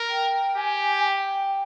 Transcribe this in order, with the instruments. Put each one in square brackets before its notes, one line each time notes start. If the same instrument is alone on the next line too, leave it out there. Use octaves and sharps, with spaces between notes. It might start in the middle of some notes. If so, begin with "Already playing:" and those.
Already playing: [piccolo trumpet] A#4
[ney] G5
[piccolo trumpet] G4 [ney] G#5
[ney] G5